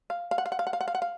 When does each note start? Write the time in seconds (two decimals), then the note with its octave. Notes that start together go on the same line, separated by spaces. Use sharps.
0.10 F5
0.31 F5
0.38 F#5
0.46 F5
0.52 F#5
0.59 F5
0.67 F#5
0.73 F5
0.81 F#5
0.88 F5
0.95 F#5
1.02 F5